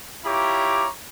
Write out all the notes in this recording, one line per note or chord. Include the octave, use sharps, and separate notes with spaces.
E4 F4 G4 C#5 A#5 D6